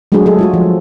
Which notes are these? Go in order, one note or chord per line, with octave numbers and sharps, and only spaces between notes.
F#3 G#3 A3 D4 F#4 G#4
F#3 G#4 A4
G#3 F4 F#4
F3